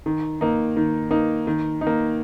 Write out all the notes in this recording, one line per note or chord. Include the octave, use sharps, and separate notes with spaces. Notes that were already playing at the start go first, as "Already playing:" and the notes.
D#3
A#3 D#4
D#3
A#3 D#4
D#3
D#4
A#3